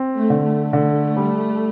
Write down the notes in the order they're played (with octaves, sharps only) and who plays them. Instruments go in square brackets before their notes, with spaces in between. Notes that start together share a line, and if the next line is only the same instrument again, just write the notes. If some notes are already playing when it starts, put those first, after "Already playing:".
Already playing: [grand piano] C4
[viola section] A3
[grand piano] D3
[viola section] A3
[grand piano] D3
G3